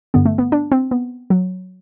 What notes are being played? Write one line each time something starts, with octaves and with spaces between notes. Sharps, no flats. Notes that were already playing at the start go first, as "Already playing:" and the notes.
G2 D3 B3
A3
B3
D4
C4
B3
F#3